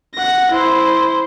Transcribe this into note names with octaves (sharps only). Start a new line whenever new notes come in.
F#5 A#6
E4 C5